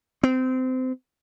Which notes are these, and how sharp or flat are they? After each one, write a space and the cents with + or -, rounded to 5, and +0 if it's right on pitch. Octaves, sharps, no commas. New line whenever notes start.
C4 -25